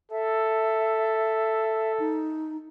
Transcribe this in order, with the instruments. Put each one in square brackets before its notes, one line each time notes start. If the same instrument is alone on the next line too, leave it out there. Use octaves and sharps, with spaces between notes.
[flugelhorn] A4 [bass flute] E5
[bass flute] D#4